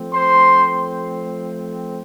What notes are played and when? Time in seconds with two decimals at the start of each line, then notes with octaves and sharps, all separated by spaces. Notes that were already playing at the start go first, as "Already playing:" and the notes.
Already playing: F3 A3 C4
0.13 C5 C6